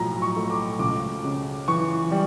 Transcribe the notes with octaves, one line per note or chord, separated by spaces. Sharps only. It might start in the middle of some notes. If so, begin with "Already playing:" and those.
Already playing: B1 A2 F3 A#5
C#6
A3
D6
C#2 D6
C#3
E3 C#6
G3